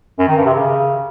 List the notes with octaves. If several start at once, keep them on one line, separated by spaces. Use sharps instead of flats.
F#2
D#3
G2
C3
C#3